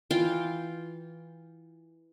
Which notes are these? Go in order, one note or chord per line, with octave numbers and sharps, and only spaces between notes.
E3 F4 F5 G5